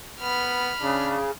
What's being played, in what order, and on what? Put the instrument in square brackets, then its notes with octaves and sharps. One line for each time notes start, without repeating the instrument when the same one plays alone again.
[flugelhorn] B3 [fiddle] B5 F6
[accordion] C#3 [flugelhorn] D4